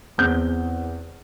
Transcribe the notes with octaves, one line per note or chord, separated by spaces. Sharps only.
E2 C4 G6